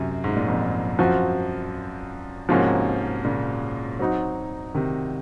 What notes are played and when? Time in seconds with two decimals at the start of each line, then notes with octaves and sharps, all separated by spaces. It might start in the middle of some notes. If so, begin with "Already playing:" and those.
Already playing: F#2 C3 C#4
0.24 G#2
0.36 A#2
0.48 F2 G#2
0.99 F#2 F3 C4 F#4
2.49 G#2 C3 F3 A#3 C#4 F#4
3.24 A#2 C#3
3.99 F#3 C4 D#4 F#4
4.74 C3 D#3